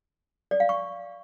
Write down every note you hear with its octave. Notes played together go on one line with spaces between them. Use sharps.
D5
F5
C#6